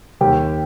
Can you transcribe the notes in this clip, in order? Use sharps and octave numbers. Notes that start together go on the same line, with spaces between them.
D#2 G4 G5